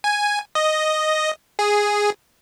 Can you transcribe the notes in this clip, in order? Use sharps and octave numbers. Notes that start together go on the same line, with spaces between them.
G#5
D#5
G#4